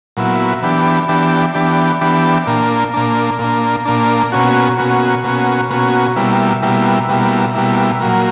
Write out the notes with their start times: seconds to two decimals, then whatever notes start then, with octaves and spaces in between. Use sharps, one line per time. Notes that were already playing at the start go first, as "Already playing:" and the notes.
0.17 A#2 F#3 B3 E4
0.63 E3 B3 D4 G4
1.08 E3 B3 D4 G4
1.55 E3 B3 D4 G4
2.01 E3 B3 D4 G4
2.47 A#2 A#3 D4
2.94 A#2 A#3 D4
3.39 A#2 A#3 D4
3.85 A#2 A#3 D4
4.32 B2 A#3 C#4 F#4
4.78 B2 A#3 C#4 F#4
5.24 B2 A#3 C#4 F#4
5.70 B2 A#3 C#4 F#4
6.16 B2 G3 A#3 E4
6.62 B2 G3 A#3 E4
7.09 B2 G3 A#3 E4
7.54 B2 G3 A#3 E4
8.00 A#2 F#3 A#3